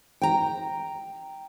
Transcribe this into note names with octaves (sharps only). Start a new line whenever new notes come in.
G5 A#5